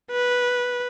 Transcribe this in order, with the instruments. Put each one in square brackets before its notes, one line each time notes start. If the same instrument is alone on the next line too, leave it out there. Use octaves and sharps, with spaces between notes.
[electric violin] B4